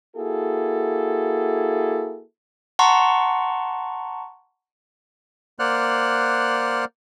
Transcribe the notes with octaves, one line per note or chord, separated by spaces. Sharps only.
A#3 E4 F#4 G#4 A4
F#5 A5 A#5 C6 C#6
A#3 C5 D5 F#5 F6 F#6